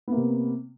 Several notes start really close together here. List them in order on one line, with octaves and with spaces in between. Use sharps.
B3 A#3 C3